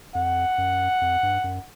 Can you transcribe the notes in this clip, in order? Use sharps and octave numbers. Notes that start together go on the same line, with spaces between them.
F2 F#5
F#2
F2
G2
F#2